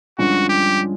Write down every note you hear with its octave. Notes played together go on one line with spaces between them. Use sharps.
G2 D3 F3 G#3 C#4 F#4
G4